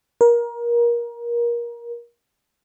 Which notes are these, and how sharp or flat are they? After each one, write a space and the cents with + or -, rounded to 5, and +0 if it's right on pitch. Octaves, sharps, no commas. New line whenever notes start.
A#4 +25